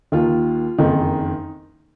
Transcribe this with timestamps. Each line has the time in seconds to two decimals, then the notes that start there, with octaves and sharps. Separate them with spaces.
0.12 D#2 D#3 F4
0.78 F#1 F2 D#3 D#4